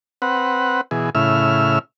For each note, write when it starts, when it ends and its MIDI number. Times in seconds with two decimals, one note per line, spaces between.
0.22 0.81 60
0.22 0.81 71
0.22 0.81 78
0.91 1.10 47
0.91 1.10 52
0.91 1.10 68
1.15 1.79 45
1.15 1.79 49
1.15 1.79 64
1.15 1.79 76
1.15 1.79 89